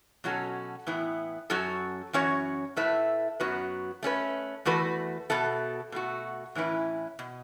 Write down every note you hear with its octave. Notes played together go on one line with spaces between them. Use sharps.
B2 F#3 C#4 F#4 A4
A2 E3 B3 E4
F#2 F#3 C#4 F#4 A4
F#2 E3 C#4 F#4 C#5
A2 A3 E4 B4 E5
F#2 F#3 B3 F#4 B4
A3 C#4 F#4 B4
E2 E3 A3 F#4 B4
B2 B3 A4 E5
B2 A3 F#4
A2 E3 C#4 E4 B4
B2